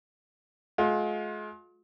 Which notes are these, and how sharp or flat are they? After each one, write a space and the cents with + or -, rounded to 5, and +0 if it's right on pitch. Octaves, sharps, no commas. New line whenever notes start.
G#3 +40 F4 +40